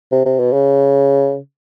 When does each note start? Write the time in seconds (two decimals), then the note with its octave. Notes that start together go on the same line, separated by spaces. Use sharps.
0.12 C3
0.25 C3
0.39 B2
0.53 C#3